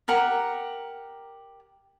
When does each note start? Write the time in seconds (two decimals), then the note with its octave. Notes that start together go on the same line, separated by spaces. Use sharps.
0.08 G4 A#4 F#5 A#5